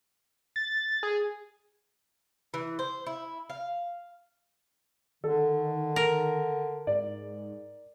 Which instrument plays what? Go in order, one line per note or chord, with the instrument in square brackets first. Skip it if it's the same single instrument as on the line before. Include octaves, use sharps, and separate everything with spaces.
[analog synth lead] A6
G#4
[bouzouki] E3
C5
E4
F5
[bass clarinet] D3 [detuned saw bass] D#3 [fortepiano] A4
[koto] A#4
[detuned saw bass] G#2 [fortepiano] D5